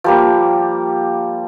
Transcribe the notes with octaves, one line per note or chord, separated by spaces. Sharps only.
F3 G3 A#3